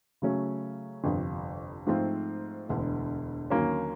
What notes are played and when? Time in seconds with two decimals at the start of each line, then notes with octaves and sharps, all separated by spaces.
0.22 C#3 F#3 A3 C#4
1.04 G1 F2 C3
1.87 G#2 F3 A3 C4 F4
2.69 E1 D2 D3
3.50 D#2 D3 F#3 A#3 C#4